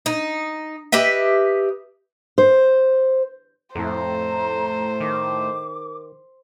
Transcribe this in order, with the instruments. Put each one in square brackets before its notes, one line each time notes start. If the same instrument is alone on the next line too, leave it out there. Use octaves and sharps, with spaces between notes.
[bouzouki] D#4
G4 B4 D#5 E5
[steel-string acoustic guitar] C5
[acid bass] F2 [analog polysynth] A2 A3 [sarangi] C5 [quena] A#5
[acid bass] D#3 [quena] D6